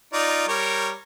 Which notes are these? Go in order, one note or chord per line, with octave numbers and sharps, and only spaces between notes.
D#4 F4 D5
G3 A#4 C#5